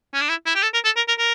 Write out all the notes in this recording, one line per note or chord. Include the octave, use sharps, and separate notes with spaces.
C#4
D4
E4
E4
G4
A4
A#4
A4
A#4
A#4
A#4